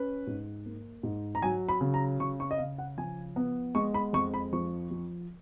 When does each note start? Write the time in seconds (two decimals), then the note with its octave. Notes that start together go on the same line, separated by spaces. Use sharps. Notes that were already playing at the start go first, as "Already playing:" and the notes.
Already playing: C#4 B4
0.27 G#2
0.66 A#3
1.03 G#2
1.35 A#5
1.42 F#3 G#5
1.69 B5
1.81 C#3
1.94 A#5
2.19 C#3 C#6
2.40 C#6
2.51 D#5
2.58 C#3 F5
2.78 F#5
2.98 F3 G#5
3.36 B3
3.75 G#3 C#6
3.94 B5
4.13 F2 C#6
4.34 B5
4.53 F3 C#6
4.91 F3